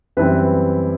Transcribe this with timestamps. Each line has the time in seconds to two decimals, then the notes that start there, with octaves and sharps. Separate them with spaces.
0.17 F#2 E3 G3 C4 B4